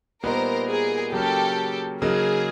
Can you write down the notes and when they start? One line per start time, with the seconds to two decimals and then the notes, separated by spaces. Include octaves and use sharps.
0.23 A#2 G3 B3 D#4 A#4 C5
0.68 G#4 A#4
1.12 C#3 F#3 A#3 C#4 G4 A4
2.02 C#3 F#3 A#3 D#4 G#4